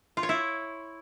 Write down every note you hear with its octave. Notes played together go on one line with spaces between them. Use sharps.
F4
C#5
E4